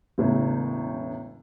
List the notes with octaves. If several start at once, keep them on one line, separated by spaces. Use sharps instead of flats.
E1 C#2 A2